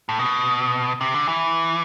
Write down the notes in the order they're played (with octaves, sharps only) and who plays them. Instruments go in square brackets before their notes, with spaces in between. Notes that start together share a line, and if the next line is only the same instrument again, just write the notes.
[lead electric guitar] A2
B2
C3
D3
E3